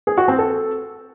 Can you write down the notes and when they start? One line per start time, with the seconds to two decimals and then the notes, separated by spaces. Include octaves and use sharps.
0.07 G#4
0.18 F#4
0.28 C4
0.38 A4